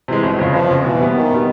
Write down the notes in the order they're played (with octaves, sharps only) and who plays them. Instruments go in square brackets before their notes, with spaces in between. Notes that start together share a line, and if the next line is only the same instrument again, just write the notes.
[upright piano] C3 E3 G#3
[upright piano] G1 [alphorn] F#3
[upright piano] F2 C#3
[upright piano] G1 [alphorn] F3
[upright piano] F2 C#3
[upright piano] B2 [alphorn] E3
[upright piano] G3 B3
[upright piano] B2 [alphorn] D#3
[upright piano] G3 B3